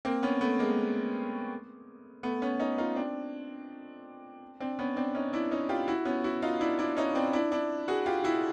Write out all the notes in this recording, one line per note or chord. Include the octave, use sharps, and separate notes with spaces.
A#3 C4
B3 C#4
A3 B3
G#3 A#3
A3 B3
B3 C#4
C#4 D#4
D#4 F4
C4 D4
C4 D4
B3 C#4
C4 D4
C#4 D#4
D4 E4
C#4 D#4
F4 G4
E4 F#4
B3 C#4
E4 F#4
D#4 F4
D4 E4
D4 E4
C#4 D#4
C4 D4
D4 E4
D4 E4
F#4 G#4
F4 G4
E4 F#4